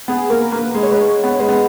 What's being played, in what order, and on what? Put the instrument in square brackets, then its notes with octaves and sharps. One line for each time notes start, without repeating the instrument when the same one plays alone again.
[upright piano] B3 [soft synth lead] G#4
[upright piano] A#3 [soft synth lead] A#4
[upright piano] A#3 [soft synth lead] B4
[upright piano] G#3
[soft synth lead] C#5
[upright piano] G#3 [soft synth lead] B4
[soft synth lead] C#5
[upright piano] B3
[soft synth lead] C#5
[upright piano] G#3 [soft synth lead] B4
[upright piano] B3